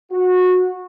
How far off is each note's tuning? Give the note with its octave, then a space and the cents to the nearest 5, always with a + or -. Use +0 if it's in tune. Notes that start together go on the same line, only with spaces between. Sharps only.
F#4 -20